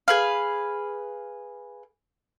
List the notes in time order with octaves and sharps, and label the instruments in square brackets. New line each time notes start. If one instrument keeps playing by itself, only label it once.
[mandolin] G#4 B4 F5